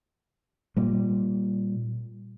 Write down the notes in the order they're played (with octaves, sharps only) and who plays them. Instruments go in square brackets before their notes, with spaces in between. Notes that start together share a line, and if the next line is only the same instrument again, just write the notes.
[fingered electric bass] A#2 G3